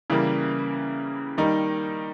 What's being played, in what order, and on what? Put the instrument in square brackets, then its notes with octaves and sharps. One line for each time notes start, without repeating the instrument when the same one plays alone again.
[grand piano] C#3 E3 G3 A#3
D#3 G3 A#3 D#4